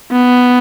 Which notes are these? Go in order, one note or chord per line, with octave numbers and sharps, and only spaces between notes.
B3